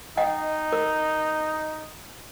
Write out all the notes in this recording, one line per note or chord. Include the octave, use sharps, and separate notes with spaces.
D#4 D#5 F#5 G5
A#4